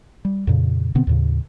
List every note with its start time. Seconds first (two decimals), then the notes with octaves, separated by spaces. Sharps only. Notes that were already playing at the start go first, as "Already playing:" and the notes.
0.25 G3
0.47 F2 A#2 C#3
0.95 B2 D3 B3 C4
1.07 D#2 A2 C#3